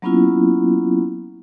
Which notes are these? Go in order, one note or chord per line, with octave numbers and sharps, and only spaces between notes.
F#3 A#3 B3 C#4 E4 F4